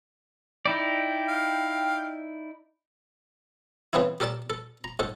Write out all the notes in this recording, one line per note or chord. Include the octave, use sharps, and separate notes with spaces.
D#4 E4 D5 G5
F5
C#3 E3 B3 C4 D#4 E4
G4 A4 A#4 D5 A5
A4
A#5
G#2 A4